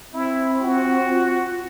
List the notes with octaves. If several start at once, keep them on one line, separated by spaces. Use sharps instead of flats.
C4 E4
F4 F#4